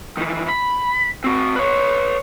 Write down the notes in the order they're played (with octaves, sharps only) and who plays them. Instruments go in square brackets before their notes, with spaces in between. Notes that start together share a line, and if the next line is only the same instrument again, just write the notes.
[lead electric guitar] D#3 E3
B5
C4 F#4
B4 C#5